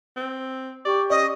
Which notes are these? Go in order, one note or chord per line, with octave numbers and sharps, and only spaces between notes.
C4
G4 D5 C#6
C#4 D5 D#5